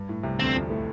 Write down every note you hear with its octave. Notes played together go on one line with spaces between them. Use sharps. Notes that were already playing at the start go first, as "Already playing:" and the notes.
Already playing: G2
A2
C2 C3
D2 D3 C4
F2 F3
A2 A3